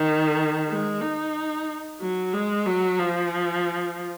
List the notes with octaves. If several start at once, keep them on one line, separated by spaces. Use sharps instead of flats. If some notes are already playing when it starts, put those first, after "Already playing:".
Already playing: D#3
G#3
D#4
F#3
G#3
F#3
F3